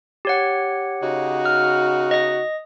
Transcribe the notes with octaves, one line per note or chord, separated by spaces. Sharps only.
G4 C#5 F#5
C#3 D#4 F#4
F6
D#5 A#6